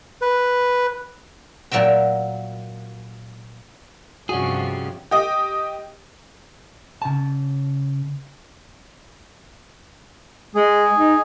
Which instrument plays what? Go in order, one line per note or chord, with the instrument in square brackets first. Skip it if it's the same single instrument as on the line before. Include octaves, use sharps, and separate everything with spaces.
[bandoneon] B4
[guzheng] A#2 F#3 A#4 E5 G5
[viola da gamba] G2 C3 F3 [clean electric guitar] C#4 G#4 [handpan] F#4
[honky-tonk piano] G4 D#5
[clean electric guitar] C#3 A5
[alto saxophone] G#3 [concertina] G#4
[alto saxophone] D#4